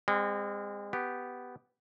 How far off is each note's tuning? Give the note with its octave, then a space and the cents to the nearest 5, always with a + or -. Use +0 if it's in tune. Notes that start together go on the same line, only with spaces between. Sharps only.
G#3 -40 C4 -10
B3 +5 G4 +0